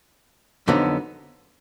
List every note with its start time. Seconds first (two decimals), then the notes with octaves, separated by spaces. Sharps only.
0.68 F2 D3 F#3 B3 D#4